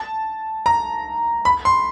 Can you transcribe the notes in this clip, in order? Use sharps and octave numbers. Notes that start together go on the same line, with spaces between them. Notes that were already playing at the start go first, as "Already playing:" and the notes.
Already playing: A5
A#5
B5
C6